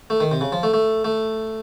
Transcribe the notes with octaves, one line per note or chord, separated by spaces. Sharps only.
A3
D#3
C3
C#3
F3
A3
A3
A3